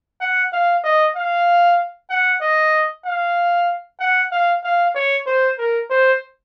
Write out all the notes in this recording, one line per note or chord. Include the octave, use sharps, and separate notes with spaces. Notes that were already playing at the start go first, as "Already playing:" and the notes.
F#5
F5
D#5
F5
F#5
D#5
F5
F#5
F5
F5
C#5
C5
A#4
C5